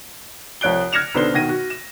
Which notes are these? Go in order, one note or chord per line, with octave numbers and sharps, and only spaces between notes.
C2 F3 C#5 F#6 D7 G7
F6 G#6 A#6 C#7 E7 F7
B1 D3 B3 C5 G7
B2 D#3 G#6 A#6 D#7
F#4
E7